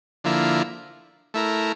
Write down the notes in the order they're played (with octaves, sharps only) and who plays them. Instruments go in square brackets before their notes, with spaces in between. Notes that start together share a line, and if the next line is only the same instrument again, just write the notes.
[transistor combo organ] D3 F3 A#3 E4
A3 E4 A#4